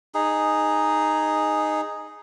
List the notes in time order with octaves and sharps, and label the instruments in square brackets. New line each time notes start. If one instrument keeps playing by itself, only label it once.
[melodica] D#4 G#4